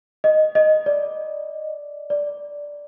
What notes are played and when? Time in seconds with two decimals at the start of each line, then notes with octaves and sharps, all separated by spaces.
0.24 D#5
0.55 D#5
0.86 D5
2.10 D5